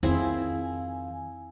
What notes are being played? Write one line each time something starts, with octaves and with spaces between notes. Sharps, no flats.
F2 D#3 C4 E4 G#4 F5 G#5